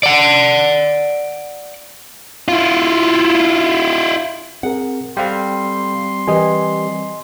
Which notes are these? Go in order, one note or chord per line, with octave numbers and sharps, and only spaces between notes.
D5 F#5
E4 F4
C4 G#4 A#4 F#5
G3 C4 A4 F5 G5 C6
E3 G4 A#4 D#5 G#5